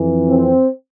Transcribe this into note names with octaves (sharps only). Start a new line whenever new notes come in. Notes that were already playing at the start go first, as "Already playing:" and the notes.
Already playing: F2 E3
C4